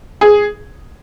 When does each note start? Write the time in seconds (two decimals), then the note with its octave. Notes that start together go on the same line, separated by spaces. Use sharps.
0.21 G#4